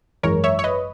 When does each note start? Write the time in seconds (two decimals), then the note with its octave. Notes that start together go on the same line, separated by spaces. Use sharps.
0.23 G#1 F#2 E3 G#3 A#4 C#5
0.44 C#5 E5
0.59 C#5
0.64 B4 D#5